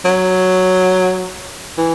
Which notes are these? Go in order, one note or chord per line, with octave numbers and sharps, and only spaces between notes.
F#3
E3